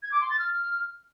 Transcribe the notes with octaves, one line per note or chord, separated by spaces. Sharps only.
G#6
D6
C6
A6
F6